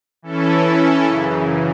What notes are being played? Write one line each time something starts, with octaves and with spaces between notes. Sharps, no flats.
E3 C#4 E4 A4
F#2 C#3 E3